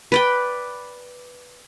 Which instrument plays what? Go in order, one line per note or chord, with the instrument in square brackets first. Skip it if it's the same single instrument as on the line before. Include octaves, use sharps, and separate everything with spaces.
[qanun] B4 D5 G5